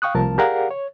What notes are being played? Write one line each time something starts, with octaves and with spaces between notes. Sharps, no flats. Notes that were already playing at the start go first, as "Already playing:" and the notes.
F5 G5 C#6 D#6 F#6
C2 F3 A3 A#4 A5
G4 G#4 A#4 D5 F5 F#5
C#5